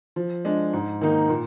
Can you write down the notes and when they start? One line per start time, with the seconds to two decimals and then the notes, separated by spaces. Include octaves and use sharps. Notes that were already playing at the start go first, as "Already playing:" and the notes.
0.16 F3
0.45 G#3 D4
0.73 G#2
1.01 D#3 A#3 D#4
1.29 A#2